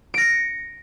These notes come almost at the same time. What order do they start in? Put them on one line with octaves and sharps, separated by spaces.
D7 A#6 C#7